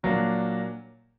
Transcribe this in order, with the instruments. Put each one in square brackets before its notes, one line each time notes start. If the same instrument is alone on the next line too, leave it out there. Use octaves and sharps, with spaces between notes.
[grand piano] A#2 F#3 A#3 D4